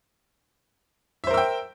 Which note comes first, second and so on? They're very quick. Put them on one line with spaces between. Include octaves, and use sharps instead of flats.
E5 C5 A#4 E6 G5